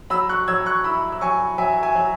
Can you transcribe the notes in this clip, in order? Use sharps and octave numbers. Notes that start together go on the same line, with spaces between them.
F#3 B5 E6
C#6 F#6
F#3 E6 G#6
C#6 F#6
E4 B5 E6
E6
F#3 G#5 C#6
F#3 E5 G#5
E5 G#5
F#3